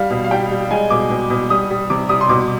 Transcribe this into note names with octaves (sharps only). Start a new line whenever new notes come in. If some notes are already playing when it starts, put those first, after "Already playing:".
Already playing: G3 F5
B2
F5
G3 G5
G3
G#3 G#5
B2 D6
B2
B2
G3 D#6
G3
C3 D6
G3 D#6
C6
B2 D6